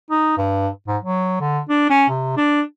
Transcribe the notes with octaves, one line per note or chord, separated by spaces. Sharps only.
D#4
G2
G#2
F#3
D3
D4
C#4
C3
D4